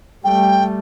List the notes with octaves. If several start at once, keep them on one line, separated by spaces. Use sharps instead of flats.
G3 A3 G5